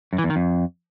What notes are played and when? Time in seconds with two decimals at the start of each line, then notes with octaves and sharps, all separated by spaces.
0.13 F#2
0.18 E3
0.24 E2
0.30 D#3
0.36 F2